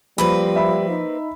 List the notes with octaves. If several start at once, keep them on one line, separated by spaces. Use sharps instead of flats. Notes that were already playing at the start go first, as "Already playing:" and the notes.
F3 G3 A#3 C4 B4 B5
E5 B5
D#4